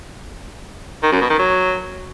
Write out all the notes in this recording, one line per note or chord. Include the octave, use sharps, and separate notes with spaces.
D#3
F#2
B2
D#3
F#3